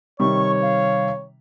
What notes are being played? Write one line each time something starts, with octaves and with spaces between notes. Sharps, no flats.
C3 D#3 G3 C#5 C#6
F5